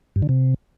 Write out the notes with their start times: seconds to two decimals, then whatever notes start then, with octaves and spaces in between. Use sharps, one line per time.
0.16 G2
0.22 D3
0.29 C3